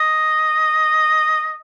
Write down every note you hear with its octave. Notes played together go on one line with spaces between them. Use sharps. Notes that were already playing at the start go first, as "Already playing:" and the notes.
Already playing: D#5